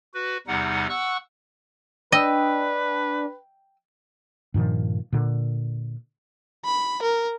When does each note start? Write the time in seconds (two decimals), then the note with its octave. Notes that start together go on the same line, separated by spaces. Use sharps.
0.14 F#4 B4
0.47 E2 C3 G3 D#4 F#5
0.89 F#5 C#6 E6 F#6
2.12 D4 B4 D#5 G5 E6
4.54 G2 A#2 D#3 F3
5.13 A#2 D3
6.65 B5
7.03 A#4